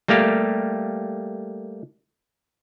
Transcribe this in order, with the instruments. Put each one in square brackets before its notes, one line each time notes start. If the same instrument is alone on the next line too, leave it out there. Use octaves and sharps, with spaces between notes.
[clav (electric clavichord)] G3 A3 A#3 G4 F5